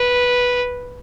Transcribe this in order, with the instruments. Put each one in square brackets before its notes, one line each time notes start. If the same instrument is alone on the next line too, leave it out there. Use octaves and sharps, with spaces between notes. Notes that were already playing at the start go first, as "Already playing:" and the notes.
Already playing: [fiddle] B4